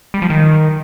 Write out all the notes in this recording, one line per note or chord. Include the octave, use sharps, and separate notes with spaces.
G3
F3
D#3